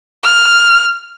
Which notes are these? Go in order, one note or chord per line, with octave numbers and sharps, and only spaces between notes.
F6